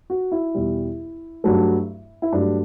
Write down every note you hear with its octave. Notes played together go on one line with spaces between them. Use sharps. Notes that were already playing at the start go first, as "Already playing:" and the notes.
F#4
E4
E2 B2 G3
G2 F#3 A3
E4
G2 F#3 A3 D4